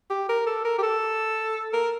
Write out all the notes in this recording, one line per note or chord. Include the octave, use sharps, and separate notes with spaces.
G4
A#4
A4
A#4
G4
A4
A#4